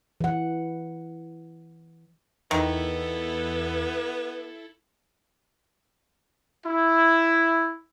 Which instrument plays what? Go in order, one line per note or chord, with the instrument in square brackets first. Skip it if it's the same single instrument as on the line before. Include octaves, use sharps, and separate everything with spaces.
[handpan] E3 F#5
[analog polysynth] E2 E3 [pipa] D#3 [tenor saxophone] B3 [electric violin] E4 A4
[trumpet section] E4